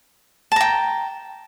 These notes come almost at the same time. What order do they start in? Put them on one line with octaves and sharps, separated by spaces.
A5 A#5 G5